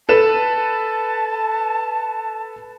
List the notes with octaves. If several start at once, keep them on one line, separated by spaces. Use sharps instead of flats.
A4 B4 A5 E7